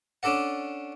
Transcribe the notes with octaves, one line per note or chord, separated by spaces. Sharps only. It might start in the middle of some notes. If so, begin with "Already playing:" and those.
C#4 D4 A4 D5 F#5